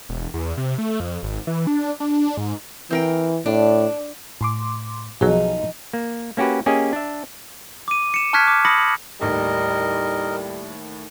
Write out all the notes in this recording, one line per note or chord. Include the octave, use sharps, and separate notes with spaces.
E1
E2
C3
A3
F2
G#1
E3
D4
D4
G#2
E3 C4 A#4 G5
A2 D4
A2 C6 D6
B1 F3 F#3 D#4 G#4
A#3
A#3 C#4 F#4 G4 B4
A#3 C#4 G4 G#4 D#5
D4 E5
D6 D#7
C#7 E7
A5 C#6 F6 F#6 G#6 B6
D6
B5 D#6 A#6 C#7 F#7
D#2 A2 G3 E4 A#4 D#5